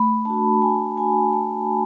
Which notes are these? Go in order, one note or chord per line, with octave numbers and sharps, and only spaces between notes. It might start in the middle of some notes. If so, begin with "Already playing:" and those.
Already playing: A3 B5
D4 F#4 A5
A3 G#5
D4 F#4 G#5
A3 A5
D4